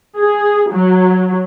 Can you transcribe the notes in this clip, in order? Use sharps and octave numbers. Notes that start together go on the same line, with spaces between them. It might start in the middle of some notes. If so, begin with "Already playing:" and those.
G#4
F#3